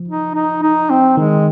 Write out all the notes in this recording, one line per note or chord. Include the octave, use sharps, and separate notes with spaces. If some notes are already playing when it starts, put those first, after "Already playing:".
Already playing: F3
D#4
D#4
D#4
C4
D#3 G#3